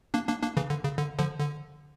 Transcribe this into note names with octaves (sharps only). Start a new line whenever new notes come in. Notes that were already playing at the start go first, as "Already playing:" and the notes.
A#3 D4
A#3 D4
A#3 D4
C#3 E3
D3
C#3
D3
D3 F3
D3